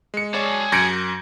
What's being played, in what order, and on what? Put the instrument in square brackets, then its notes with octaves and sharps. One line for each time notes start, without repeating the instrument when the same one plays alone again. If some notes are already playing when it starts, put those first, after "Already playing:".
[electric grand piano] G#3 C#7
[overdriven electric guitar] G#4 A5 [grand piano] C#5 D5
[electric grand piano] F#2 G6 A#6 [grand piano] G#6 C#7 D7